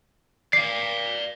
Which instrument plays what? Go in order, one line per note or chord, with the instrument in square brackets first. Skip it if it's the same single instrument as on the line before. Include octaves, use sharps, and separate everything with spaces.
[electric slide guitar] D5 F5 [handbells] C7